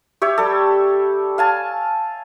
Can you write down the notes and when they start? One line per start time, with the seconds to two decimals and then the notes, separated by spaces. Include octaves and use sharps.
0.22 G4 C#5 E5
0.38 G3 A4
1.38 F5 G#5 A5